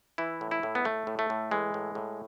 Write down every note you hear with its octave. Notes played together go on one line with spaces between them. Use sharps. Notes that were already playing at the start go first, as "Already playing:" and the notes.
E3 E4
A2
E4
A2
B3
A2 A3
A2
A3
A2
E3 G#3
A2
A2